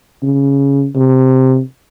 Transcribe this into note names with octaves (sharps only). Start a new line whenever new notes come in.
C#3
C3